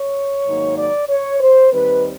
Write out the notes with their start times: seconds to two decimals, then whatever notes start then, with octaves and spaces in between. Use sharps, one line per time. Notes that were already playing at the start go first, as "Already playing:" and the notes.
Already playing: C#5
0.46 G#2 D#3 F#3 A#3 D#4
0.78 D5
1.09 C#5
1.40 C5
1.71 D#2 D#3 G3 C4 B4